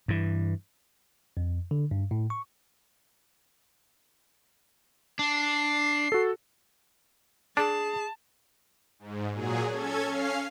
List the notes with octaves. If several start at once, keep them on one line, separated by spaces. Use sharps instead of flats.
G2 E3
F2
D3
G2
A2
C#6
D4 C7
F#4 A4
D4 G#4 A5
G#2
A#2 F#3 G#4
C#4 A4 G#6
C#4 F5 F6 C7